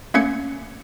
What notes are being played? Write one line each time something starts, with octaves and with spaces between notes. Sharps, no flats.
A3 A#3 C#4 G#6 C#7